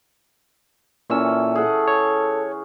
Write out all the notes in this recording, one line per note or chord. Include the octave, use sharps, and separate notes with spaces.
A#2 E3 C#4 A4 E6
G#4 A4 F#5
C#5